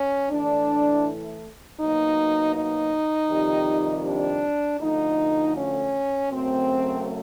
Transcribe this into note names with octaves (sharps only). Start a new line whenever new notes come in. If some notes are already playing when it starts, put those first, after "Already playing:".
Already playing: C#4
A2 E3 A3 D4
B2 F#3 A#3 D#4
D#4
F2 C3 D#3 G3
D4
D2 D3 F3 A3 D#4
C#4
F#2 C#3 F#3 A3 C4